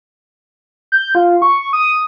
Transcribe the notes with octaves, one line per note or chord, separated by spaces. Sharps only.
G6
F4
C#6
D#6